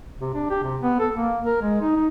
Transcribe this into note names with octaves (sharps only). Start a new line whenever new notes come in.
C3
D4
G4
C3
B3
A4
A#3
A#4
G#3
D#4
D#4